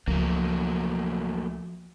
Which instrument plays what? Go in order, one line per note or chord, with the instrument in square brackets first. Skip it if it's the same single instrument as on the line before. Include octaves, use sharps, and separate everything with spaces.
[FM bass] C#2 [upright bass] F3 [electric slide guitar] F#3 A3 A#3